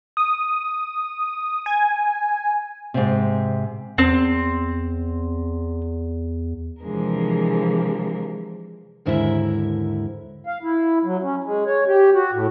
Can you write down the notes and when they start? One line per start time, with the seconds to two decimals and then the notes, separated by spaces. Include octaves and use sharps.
0.17 D#6
1.66 G#5
2.94 G#2 C3
3.98 E2 C4
6.82 C3 E3 F3 G#3 D4 A#4
9.06 D#2 G#2 D3 E4 A#4 E5
10.47 F5
10.63 E4
11.05 F#3
11.23 C#4
11.44 G#3
11.66 C#5
11.87 G4
12.14 F#4
12.32 A2